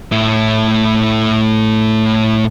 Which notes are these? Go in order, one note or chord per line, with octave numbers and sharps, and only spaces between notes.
A2 E4